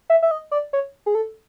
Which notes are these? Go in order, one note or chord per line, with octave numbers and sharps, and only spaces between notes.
E5
E5
D#5
D5
C#5
G#4
A4